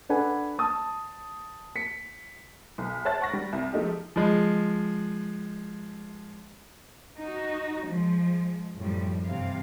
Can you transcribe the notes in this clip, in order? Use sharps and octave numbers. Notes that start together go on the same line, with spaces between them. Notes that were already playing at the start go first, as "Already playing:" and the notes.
D4 A4 B4 F#5 G#5
A5 D#6
B6 C#7
B1
C5 C#5 E5 A5 F#6 A6
F#5 C#6 A#6
G3
C2
F3 G#3 A3 D#4 G4
F3 G#3
D#4 F#4
F3 G#3
F#2 A2 F3 G3
G2 C3 E3 F5